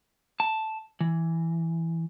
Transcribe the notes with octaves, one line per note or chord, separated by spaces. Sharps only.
A5
E3